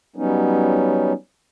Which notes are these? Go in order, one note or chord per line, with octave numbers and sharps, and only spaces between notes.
F#3 G3 B3 C#4 D#4